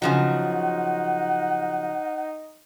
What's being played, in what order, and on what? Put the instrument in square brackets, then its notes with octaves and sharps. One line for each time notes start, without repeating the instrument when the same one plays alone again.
[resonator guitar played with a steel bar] C#3 F3 F#3 [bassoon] D#4 [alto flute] F#5